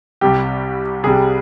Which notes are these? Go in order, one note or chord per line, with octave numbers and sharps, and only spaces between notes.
C2 C3 G3 G4
C2 C3 G3 G#4